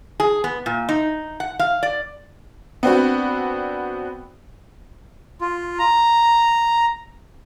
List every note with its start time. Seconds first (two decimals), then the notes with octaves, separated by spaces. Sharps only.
0.20 G#4
0.44 B3
0.66 A#2
0.89 D#4
1.40 F#5
1.59 F5
1.83 D5
2.83 B3 C4 D4 F#4
5.41 F4
5.79 A#5